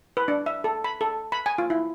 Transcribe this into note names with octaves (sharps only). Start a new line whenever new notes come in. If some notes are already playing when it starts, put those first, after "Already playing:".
B4
D4
E5
A4
B5
A4
B5
G#5
F4
E4